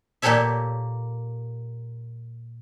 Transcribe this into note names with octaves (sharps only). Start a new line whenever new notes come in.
A#2 A#3 G4 A4 C#5 E5